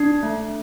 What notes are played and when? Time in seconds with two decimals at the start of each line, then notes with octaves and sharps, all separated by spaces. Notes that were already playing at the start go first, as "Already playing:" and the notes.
Already playing: D4
0.23 A3